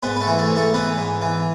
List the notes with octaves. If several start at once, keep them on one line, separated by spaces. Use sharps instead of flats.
G#2 B3 B4
B4
A3 A4
E3
A3 A4
G#2
A3 A4
E3 B3 B4
G#2
E3